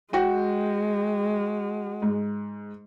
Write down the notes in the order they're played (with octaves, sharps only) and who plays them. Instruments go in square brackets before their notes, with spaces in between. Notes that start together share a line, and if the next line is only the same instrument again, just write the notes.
[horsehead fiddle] G#3 [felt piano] F#4 G5
[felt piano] G#2